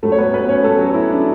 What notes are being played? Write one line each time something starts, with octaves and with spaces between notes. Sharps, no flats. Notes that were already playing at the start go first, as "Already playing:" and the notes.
A2 F#3 A3 A4
C#5
B3 B4
B3 B4
C#4 C#5
A3 A4
F#3 F#4
E4
D4